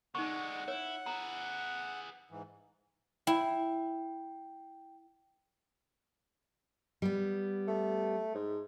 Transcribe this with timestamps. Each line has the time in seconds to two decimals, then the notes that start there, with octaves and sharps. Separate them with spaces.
0.15 D3 G#3 D#4 F#5 C#6
0.68 E4 C#5
1.06 G#4 B4 A#5
2.31 G#2 E3
3.27 E4 G5
7.02 G3 B3
7.68 A3
8.35 G#2